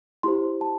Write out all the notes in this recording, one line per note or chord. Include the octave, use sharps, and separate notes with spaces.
E4 G4 C5 C6
A5